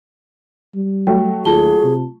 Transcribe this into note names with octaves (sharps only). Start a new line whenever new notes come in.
G3
F#3 A3 G5
D#2 F4 G#4 A5 G7
C3